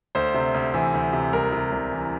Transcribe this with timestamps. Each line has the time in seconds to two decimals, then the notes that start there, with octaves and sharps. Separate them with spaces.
0.15 D2 C5
0.34 C3
0.54 D2
0.74 E3
0.94 D2
1.13 C3
1.33 C2 A#4
1.52 C3
1.72 C2
1.92 E3